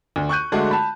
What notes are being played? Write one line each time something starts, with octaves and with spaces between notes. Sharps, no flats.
D2
C#6 F#6 G6 D#7
D3 G#3 A3 D4 F#4
A5 B5